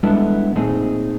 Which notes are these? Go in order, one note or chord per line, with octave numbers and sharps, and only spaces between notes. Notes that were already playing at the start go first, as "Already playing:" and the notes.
G3 G#3 B3 D4 E4 A4
A#2 A3 C4 D#4 G#4